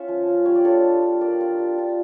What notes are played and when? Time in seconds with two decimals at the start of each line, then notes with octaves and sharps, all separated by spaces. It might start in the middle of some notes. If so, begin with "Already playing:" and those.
Already playing: C#4 F4 C#5 E5
0.08 F3
0.27 C#4 F4
0.45 G3 C#5
0.55 D5
0.64 D4 F4 A4 C#5
0.83 G3
1.02 D4 F4
1.21 G3 A#4 D5
1.40 D4 F4
1.59 G3
1.78 D4 F4